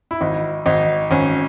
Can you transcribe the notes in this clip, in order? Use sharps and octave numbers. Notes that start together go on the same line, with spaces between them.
E4
G#1 D#4
G#1 D#4
G#1 C#4